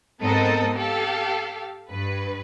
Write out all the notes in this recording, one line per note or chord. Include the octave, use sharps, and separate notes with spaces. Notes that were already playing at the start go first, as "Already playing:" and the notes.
G#2 B3 C4 A4 A#4 D#5
G4 A4 F5
G2 B4